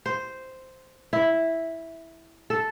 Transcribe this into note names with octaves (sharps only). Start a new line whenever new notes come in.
C5
E4
A4